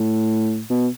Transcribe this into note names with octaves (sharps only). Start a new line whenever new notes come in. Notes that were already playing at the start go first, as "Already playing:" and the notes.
Already playing: A2
B2